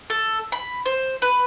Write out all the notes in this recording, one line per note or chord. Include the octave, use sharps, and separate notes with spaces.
A4
B5
C5
B4